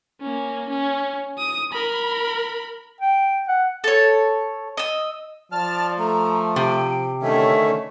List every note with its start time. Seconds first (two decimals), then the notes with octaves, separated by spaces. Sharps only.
0.21 A#3 C#4
0.69 C#4
1.38 D#6
1.73 A#4 B5
3.01 G5
3.48 F#5
3.84 A4 C#5
4.77 D#5 E6
5.52 F3 D5 A5 F6
5.99 A3 A#5
6.56 C3 G5
7.22 D3 D#3 A3 C#4 E5